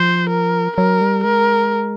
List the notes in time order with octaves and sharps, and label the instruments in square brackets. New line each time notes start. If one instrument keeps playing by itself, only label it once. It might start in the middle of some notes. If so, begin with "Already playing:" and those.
Already playing: [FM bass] F3 [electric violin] C5
[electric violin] A#4
[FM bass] F#3 [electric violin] A#4
[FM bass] G3
[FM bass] G#3 [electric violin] A#4